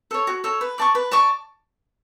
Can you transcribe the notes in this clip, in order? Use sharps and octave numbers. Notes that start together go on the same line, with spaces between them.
A4 C#5
F#4
A4 C#5
B4
D5 A5 C#6
B4
D5 A5 C#6